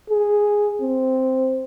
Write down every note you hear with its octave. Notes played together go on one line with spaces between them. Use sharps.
G#4
C4